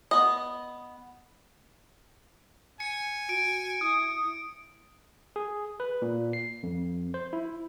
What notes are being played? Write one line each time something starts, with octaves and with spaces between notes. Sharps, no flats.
B3 D#5
G#5 C#7
F#4 D7
E4 D#6
G#4
B4
A#2
C7
F2
C5
E4